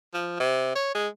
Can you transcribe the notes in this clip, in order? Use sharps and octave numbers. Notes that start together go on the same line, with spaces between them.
F3
C3
C#5
G#3